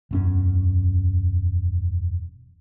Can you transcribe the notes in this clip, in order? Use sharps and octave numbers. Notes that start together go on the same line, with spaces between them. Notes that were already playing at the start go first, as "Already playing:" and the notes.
E1 F#2 C#4